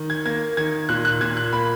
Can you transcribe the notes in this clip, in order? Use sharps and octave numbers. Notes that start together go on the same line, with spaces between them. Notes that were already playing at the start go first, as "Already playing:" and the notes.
Already playing: D#3
G#6
A#3 G#6
D#3 G#6
A#2 F#6
F#6
A#2 G#6
F#6
A#3 B5